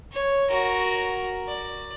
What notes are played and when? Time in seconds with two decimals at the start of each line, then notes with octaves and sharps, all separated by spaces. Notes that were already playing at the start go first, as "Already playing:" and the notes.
0.12 C#5
0.50 F#4 A#4
1.48 D5